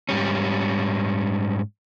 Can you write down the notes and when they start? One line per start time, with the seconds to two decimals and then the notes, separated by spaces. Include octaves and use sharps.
0.09 G#2 G3 C#4